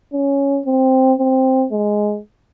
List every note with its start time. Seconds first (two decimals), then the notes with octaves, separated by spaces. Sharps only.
0.13 C#4
0.66 C4
1.18 C4
1.72 G#3